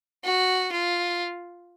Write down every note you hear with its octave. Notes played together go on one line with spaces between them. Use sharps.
F#4
F4